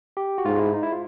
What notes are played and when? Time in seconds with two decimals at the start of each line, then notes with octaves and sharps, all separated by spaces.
0.17 G4
0.38 F#4
0.45 G#2 F4
0.59 E4
0.73 D#4
0.83 E4
0.92 F4